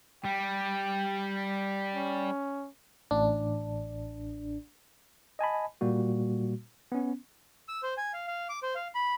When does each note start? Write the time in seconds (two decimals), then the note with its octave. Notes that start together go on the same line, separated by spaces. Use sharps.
0.25 G3 G5
1.94 C#4
3.11 A1 D4
5.39 D#5 G#5 A5 B5
5.81 A#2 G3 A#3 F#4
6.92 B3 C#4
7.68 E6
7.83 C5
7.97 G#5
8.13 F5
8.28 F5
8.49 D6
8.63 C5
8.75 F5
8.95 B5